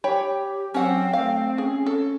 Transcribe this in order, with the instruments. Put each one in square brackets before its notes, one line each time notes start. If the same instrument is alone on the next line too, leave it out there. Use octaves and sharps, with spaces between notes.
[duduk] G4 [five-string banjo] C#5 G5 B5
[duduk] F#3 [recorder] C4 [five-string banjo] C#4 F#5
[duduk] A3 [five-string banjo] F5
[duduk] C#4 [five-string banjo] G#4
[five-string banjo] A4